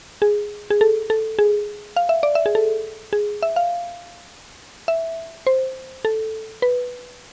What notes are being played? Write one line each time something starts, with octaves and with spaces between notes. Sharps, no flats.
G#4
G#4
A4
A4
G#4
F5
E5
D5
E5
G#4
A4
G#4
E5
F5
E5
C5
A4
B4